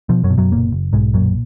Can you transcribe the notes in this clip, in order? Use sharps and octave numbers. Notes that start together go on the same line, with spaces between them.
B2 F3
F#2 F#3
B2
F#2 F#3
F#1 A#2 A#3
F#1
B1 G#2 G#3
F#2 A#2 F#3